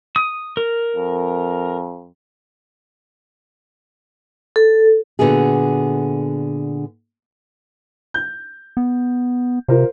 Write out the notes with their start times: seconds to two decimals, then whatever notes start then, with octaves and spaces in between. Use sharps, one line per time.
0.16 D#6
0.57 A#4
0.96 F2
4.56 A4
5.19 A#2 D3 B3 F#4 G#4
8.14 G6
8.77 B3
9.68 C3 F4 A#4 C5